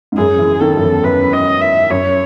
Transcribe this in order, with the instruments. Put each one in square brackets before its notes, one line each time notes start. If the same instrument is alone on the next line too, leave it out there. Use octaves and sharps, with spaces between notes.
[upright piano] G#2
[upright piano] F#2 [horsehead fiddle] G#4
[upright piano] E3
[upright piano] D#3 [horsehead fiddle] A4
[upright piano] F#2
E2
[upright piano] F#2 [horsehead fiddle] B4
[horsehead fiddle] D#5
E5
[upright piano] F#2 [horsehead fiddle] C#5